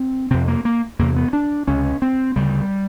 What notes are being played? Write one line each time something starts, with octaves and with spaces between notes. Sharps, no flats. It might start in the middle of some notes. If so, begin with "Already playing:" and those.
Already playing: C4
F2 C3 C4
A#3
A#3
E2 C3 A#3
B3
D4
C#2 C3 C#4
C4
D2 C#3 G3